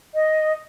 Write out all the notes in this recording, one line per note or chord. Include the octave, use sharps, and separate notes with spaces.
D#5